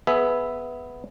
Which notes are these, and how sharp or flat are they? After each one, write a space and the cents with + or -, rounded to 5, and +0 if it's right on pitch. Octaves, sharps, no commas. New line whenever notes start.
B3 +0 G#4 +25 E5 +0